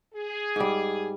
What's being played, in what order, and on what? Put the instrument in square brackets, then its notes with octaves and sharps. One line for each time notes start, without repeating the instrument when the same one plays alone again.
[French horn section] G#4
[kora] G#2 G3